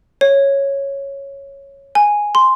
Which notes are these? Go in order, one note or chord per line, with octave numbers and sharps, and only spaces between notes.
C#5
G#5
C6